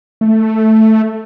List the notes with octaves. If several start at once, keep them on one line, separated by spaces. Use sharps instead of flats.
A3